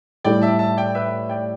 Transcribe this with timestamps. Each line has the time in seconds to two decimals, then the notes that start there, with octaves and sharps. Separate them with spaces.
0.24 A2 G3 E4 A4 D5 G5
0.42 E5 A5
0.59 E5 A5
0.77 D5 G5
0.95 B4 E5
1.30 D5 G5